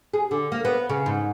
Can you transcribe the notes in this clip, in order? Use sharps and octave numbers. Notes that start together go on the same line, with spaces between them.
G#4
D3
A#3
B3
C#3
G#2